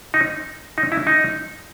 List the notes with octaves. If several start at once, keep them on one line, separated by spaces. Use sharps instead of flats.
D#4
D#4
E4
D#4